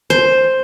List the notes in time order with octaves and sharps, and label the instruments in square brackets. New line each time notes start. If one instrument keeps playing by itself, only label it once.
[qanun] C5